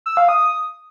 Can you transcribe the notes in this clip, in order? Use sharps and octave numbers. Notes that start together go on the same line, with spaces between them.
E6
F5
D#6